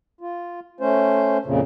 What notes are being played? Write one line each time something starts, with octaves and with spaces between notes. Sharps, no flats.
F4
A3 C#4 C5
F2 A#2 C#3